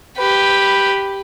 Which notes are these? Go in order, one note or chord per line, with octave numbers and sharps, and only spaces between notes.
G4 B4